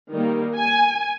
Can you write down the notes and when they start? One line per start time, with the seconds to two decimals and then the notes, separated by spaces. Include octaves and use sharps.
0.10 D#3 G3 A#3
0.56 G#5